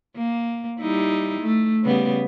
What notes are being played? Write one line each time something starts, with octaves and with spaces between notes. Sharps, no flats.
A#3
G3 D#4 E4
A3
C#3 G3 B3